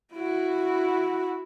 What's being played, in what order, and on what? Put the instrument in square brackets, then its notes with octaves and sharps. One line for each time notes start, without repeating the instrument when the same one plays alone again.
[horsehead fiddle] E4 F#4